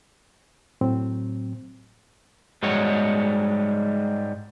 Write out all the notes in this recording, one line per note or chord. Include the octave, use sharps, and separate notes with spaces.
A2 F#3 C4
G#2 G3 G#3 F#4 C#5